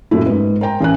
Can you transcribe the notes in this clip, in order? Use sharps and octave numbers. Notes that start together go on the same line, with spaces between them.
F#2 A#2 A3 E4
G#2 B4
A#4 C5 G5 A#5
A1 C#4 C#5 F#6